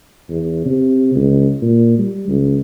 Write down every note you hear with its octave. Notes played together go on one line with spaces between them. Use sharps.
E2
C3
C#2
A#2
G3
C#2